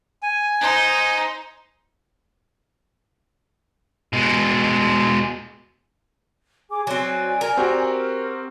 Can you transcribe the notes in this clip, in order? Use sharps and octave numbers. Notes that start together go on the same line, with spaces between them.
G#5
D#4 C5
B2 G#3
G#4 G#5 D6
F#3 C4 D5 G#5
A#4
C4 F#4 G4
F6